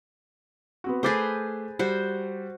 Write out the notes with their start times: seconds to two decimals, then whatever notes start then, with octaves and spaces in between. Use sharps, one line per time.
0.84 B3 C4 F#4
1.03 A3 G#4 B4 C5 D6 A6
1.79 G3 F#4 C5